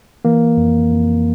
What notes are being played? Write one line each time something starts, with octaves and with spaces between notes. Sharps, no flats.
E3 A#3
F2
F2